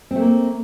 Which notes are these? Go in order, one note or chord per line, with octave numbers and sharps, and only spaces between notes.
A3 A#3 C4